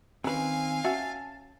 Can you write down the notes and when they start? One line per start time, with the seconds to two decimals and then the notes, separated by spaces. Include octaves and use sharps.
0.24 D#3 C4 C#4 B4 F5 G#5
0.84 C#4 F#4 E5 A5